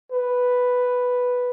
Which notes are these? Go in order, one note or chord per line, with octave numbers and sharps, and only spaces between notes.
B4